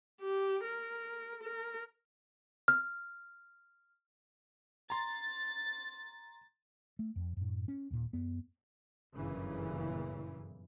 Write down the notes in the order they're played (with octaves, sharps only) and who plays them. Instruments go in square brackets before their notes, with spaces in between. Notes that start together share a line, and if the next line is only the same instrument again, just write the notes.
[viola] G4
A#4
A#4
[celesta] F6
[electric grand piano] A#5 C6 [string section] A6
[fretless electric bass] A3
F2
F#2 A2
C#4
D#2 A#2
F#2 B3
[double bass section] G1 F#2 A#2 C#3 E3